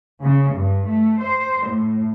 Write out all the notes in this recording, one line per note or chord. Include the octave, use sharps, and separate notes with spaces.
C#3
G2
A3
C5
A2